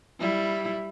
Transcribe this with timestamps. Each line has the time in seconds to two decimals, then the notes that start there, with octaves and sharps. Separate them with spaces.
0.20 G3 E4